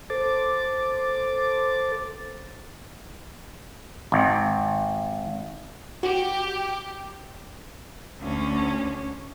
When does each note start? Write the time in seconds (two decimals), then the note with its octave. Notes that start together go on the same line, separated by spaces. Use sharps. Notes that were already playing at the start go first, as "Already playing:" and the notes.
0.10 A4 C5 D6 A6
4.12 G#1
6.03 F#4 G4
8.20 D2 C#4